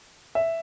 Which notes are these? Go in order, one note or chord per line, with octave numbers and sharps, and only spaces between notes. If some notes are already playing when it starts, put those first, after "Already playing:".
E5